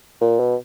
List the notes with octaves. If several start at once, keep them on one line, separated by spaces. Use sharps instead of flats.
A#2
B2